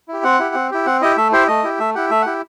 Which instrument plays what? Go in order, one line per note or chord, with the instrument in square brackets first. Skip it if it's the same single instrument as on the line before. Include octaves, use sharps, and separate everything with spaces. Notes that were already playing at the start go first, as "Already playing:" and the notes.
[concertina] E4 G4
C4 F#5
E4 G4
C4
E4 G4
C4 F#5
E4 G4 D#5
A3 E5
E4 G4 C5
A3 D#5
E4 G4
A3 E5
E4 G4 F#5
A3 E5
E4 G4 F#5